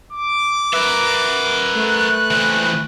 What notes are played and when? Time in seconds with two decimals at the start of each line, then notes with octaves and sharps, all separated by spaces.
0.13 D6
0.73 A#4 B4 E5
1.75 A3 F#6
2.31 E3 C4